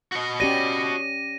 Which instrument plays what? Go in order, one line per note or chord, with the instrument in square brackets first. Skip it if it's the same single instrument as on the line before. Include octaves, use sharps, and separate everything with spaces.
[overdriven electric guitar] F#4 D#5
[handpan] C#4 G4 D5 [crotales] A#6 D#7